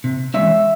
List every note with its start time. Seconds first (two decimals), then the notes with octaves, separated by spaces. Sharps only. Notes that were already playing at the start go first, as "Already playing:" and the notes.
0.04 C3
0.34 E3 G#3 C#4 E5